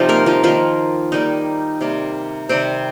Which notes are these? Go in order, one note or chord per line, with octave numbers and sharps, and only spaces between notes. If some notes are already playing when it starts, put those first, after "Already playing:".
Already playing: C3 F3 G3 D#4 F4
A#3 A#4
F3 F4
D#3 F3 A#3 F4
D#3 G3 A#3 D#4
C3 G3 A#3
C3 D#3 G3 C4